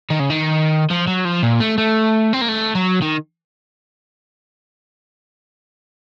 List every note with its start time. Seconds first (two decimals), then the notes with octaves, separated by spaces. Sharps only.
0.10 D#3
0.20 C#3
0.30 D#3
0.90 F3
1.07 F#3
1.25 F3
1.43 A#2
1.60 A3
1.78 A3
2.33 C4
2.41 A#3
2.48 A3
2.75 F#3
3.02 D#3